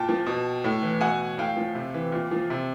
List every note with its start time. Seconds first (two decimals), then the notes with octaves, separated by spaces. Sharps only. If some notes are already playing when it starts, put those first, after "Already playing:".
Already playing: A#2 G5 A5
0.09 F3
0.26 B2
0.64 A2
0.82 E3
1.01 B2 F#5 G#5
1.38 A2 F5 G5
1.57 F3
1.75 C3
1.94 E3
2.12 A#2
2.31 F3
2.50 C3